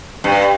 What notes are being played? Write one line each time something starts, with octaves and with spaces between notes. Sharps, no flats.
G2